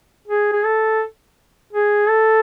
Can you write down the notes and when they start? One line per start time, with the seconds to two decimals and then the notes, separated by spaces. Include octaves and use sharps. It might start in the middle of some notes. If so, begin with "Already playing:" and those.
0.28 G#4
0.52 G#4
0.64 A4
1.73 G#4
2.09 A4